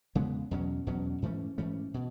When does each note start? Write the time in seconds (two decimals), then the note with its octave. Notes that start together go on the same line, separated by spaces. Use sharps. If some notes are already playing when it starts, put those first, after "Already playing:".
0.15 E2 C#3 G#3 B3
0.51 E2 B2 F#3 C#4
0.86 E2 B2 F#3 C#4
1.22 G#2 E3 A3 C#4
1.58 G#2 E3 A3 C#4
1.94 B2